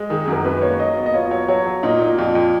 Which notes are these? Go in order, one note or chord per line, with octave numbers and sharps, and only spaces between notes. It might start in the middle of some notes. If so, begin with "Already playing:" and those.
Already playing: G#3
D#3 G#4
G#4
F#2 A#4
F#2 B4
A#3 C#5
F#3 D#5
B3
D#5
F4 C#5
F#3 C#5
F#3 C#5
F#3
A#2 D#4
A#2
F2 F4
F2